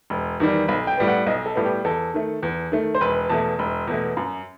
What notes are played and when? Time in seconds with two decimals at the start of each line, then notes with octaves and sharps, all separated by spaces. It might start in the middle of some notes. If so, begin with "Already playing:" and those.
0.10 E1
0.40 E2 D#3 G3
0.68 B1 B5
0.87 G5
0.98 A2 G3 B3
1.08 F#5
1.26 B1 D#5
1.46 A4
1.55 A2 G3 B3
1.66 G4
1.84 E2 A4
2.14 D#3 A3
2.43 E2
2.72 D#3 A3
2.95 C5
3.01 E1 B4
3.29 E2 B2 A3 A5
3.59 E1
3.87 E2 B2 A3
4.17 F#2